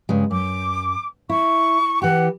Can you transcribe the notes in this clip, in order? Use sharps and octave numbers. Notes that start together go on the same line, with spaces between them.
G2 C#3 G#3
F#2 D6
E4 C#6
E3 G4 F#5